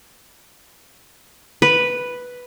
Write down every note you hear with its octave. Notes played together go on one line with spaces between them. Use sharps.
B4